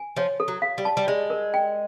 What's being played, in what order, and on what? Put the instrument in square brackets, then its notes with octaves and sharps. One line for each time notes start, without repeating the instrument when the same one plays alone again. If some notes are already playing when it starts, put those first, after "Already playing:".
Already playing: [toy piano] G#5
[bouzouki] F3 [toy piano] C#5
[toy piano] A4
[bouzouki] F#3
[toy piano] F5
[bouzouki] G3
[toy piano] A5
[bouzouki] G3
[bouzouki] G#3 [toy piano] D5
[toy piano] A#4
G5